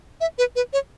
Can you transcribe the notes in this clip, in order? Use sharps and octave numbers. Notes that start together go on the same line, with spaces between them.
E5
B4
B4
C#5